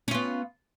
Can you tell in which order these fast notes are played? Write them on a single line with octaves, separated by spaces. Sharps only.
C#4 F4 B3